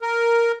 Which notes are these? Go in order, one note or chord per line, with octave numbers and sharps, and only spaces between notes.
A#4